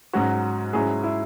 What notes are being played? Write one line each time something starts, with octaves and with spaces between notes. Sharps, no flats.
G#2 F#3 C#4 F#4
G#2 F#3 C#4 E4 G#4
E4